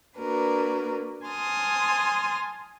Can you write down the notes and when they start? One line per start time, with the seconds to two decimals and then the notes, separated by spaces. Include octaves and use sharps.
0.18 A#3 D4 F#4 A#4 B4
1.26 G#5 A5 C6 D#6 F6